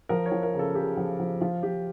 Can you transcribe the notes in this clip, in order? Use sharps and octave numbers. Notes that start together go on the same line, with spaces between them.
F3 A#4
C#5
F3
A#4
C#3
A4
C#3 G4
F3
F3
F3 F4
F3 G4